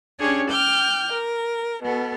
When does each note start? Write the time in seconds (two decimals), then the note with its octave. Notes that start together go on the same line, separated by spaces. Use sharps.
0.19 C#4 D4 G4 G#4 C#5
0.51 G5 D6 F6 G6
1.11 A#4
1.82 B2 B3 A4